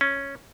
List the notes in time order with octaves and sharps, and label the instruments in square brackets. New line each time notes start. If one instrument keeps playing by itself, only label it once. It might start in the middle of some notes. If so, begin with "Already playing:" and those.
[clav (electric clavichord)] C#4